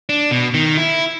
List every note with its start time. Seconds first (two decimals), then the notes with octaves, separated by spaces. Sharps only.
0.09 D4
0.31 B2
0.54 D#3
0.78 E4